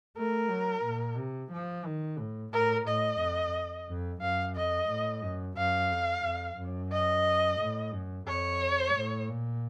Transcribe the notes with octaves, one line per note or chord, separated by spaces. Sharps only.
A3 A#4
F#3
A#2
C3
F3
D#3
A2
A2 A#4
A2 D#5
F2
F2
F#2 F5
F2 D#5
A2
F#2
F#2 F5
F2
F2
F#2
D#5
A2
F#2
F2 C#5
A2
A#2